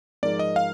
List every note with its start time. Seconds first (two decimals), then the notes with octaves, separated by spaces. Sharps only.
0.23 G#2 F3 G#3 D#4 A#4 D5
0.39 D#5
0.56 F5